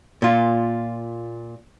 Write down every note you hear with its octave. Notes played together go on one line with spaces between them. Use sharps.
A#2 F4